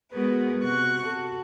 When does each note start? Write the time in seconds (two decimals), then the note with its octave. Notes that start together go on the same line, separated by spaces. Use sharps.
0.12 G#3 B3 F#4 G#4 A#4 B4
0.60 C3 F#4 C#6 F#6
1.04 F#4 A4